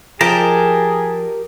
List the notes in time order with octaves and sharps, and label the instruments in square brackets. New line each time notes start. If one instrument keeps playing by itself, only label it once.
[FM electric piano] F3 [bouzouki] G4 A#4 [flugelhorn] G#4 [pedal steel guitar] D#5 A5 A#5